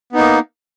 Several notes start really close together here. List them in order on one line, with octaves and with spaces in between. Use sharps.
B3 D#4 A#3